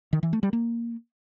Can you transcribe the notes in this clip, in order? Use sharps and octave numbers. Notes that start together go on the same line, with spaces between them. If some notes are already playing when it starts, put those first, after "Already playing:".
D#3
E3
A3
G3
A#3